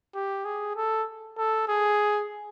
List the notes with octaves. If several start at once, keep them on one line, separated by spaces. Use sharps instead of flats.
G4
G#4
A4
A4
G#4